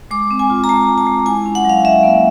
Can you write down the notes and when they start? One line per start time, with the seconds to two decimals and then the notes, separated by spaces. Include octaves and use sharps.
0.11 G#3 D6
0.31 C4
0.39 G#5
0.50 F4
0.64 A#5
0.69 G#3 A5
0.87 G#3
0.98 A5
1.07 G#3
1.26 E4 G#5
1.46 C#4
1.55 F#5
1.65 F#3 F5
1.84 C#4 E5
2.03 A#3